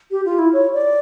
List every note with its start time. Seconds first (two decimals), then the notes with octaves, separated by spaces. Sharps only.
0.11 G4
0.25 F4
0.39 E4
0.53 C#5
0.74 D5